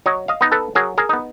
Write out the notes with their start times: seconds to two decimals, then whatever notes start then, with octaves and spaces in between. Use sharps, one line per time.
0.06 F#3 C#5 D#5
0.28 D#5 F5
0.41 B3 D#4
0.52 A4 B4
0.75 F#3 G#4 A#4
0.98 G#4 A#4
1.09 B3 D#4